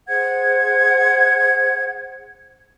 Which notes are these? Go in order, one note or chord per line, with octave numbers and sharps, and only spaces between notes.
G#4 C5 F#5 G#6